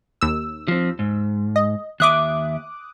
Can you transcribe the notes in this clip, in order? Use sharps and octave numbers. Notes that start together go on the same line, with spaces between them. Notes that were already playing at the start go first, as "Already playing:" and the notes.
D#2 E6
F3 C4
G#2
D#5
D#2 E5 D6 D#6 F#6